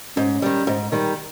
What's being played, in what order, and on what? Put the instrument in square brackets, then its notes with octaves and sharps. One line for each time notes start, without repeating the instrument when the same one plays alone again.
[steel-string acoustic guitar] G#2 [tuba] C#4
[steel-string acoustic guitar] D#3 G3
G#2
D#3 G3